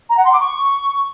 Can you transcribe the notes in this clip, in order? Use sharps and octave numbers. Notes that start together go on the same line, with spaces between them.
A#5
F#5
C6
D6
C#6